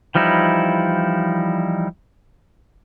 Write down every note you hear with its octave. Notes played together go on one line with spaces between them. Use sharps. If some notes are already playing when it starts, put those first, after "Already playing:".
E3 F3 G3 D#4 E4